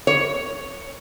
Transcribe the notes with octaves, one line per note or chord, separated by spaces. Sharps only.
C#5